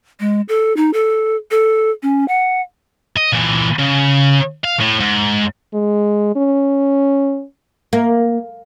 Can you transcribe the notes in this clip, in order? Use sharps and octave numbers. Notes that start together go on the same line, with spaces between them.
G#3
A4
D#4
A4
A4
C#4
F#5
D#5
A#2 E3
C#3
F5
A2
G#2
G#3
C#4
A#3